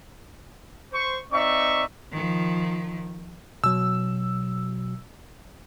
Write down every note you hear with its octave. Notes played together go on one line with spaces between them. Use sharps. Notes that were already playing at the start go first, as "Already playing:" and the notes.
C5 C#6
C4 D#4 D5 E5 C#6
D#3 F3
B2 F#3 E6